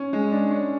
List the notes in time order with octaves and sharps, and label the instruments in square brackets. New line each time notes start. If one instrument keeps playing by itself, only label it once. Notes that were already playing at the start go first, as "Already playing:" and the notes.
Already playing: [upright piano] C#4
G#3
D4
C#4